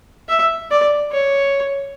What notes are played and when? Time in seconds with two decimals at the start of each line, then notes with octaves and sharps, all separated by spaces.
0.29 E5
0.71 D5
1.12 C#5